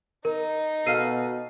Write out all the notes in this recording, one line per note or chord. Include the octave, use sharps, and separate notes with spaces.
D#4 A#4
B2 A4 B4 F5 C7 D#7